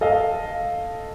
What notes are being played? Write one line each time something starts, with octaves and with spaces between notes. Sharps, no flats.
A4 D#5 F5